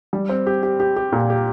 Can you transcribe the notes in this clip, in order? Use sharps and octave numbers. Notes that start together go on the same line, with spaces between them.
G3
C4
G4
G4
G4
G4
A#2
G4